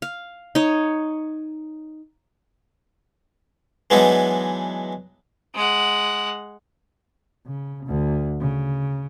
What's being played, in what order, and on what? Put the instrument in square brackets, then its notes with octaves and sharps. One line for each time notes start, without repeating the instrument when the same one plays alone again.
[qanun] F5
D#4 C#5
[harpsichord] E3 F#3 G#3 B3 D4 D#4
[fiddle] G#3 F#5
[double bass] C#3
D2
C#3